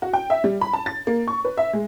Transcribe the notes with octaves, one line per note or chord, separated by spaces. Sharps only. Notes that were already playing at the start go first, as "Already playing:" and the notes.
F#4
G5
E5
G3
B5
A5
A6
A#3
C#6
B4
E5
G#3